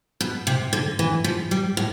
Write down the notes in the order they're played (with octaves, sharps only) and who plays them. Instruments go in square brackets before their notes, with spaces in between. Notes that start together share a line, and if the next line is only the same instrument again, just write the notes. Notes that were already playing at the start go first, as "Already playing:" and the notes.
[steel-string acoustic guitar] B2
C3
D3
E3
F3
G3
A2